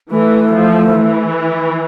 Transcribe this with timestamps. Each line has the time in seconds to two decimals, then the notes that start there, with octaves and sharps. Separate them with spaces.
0.11 E3 A3
0.53 F3
0.93 E3